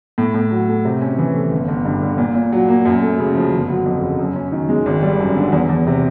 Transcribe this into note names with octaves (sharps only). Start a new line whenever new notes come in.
A2
A2
F#3
A3
C3
C#4
E3
A3
G1
G1
G2
D3
A#2
A#2
F#3
A#3
F#2
A3
C#3
F3
G1
F#3
F2
C#3
F#2
C#4
D#3
G#3
G#1
G3
F#2
D3
E2
E2
C3